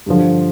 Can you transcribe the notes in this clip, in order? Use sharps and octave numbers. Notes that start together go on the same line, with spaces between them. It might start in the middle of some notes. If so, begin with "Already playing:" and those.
G2 D3 F3